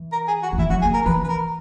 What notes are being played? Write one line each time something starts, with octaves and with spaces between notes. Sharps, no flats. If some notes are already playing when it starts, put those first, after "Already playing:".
Already playing: E3
A#4
G#4
F#4
D#3
E3 E4
F#3 F#4
A#3 G#4
A#4
E3 B4
B4
A#4